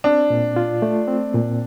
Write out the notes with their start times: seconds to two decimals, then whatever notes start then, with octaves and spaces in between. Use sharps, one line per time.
0.04 C4 D4
0.30 A#2
0.56 F4
0.82 A3
1.08 C4
1.34 A#2